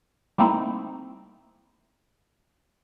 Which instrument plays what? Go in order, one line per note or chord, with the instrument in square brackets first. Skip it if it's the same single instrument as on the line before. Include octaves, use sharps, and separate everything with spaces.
[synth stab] G3 A3 A#3 C4 D#4 E4